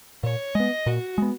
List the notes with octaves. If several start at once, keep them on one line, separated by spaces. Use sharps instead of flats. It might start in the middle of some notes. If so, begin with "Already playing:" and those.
A#2 C#5
G#3 B3 D#5
A#2 F#4
G#3 B3